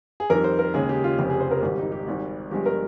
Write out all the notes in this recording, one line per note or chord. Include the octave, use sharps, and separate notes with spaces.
G#4
F2 D#3 G3 A#4
C5
A#4
D#2 C#3 G#3 G#4
G4
F4
F1 F2 C#3 G4
G#4
C5
A#4
G#1 G#2 D#3 G3 G4
D#4
G4
G#1 G#2 G3
G1 G2 F3 G#3 G4
A#4